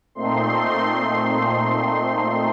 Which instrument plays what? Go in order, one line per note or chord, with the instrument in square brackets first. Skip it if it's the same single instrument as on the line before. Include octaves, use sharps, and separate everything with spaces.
[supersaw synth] A#2 A3 C4 D#4 C6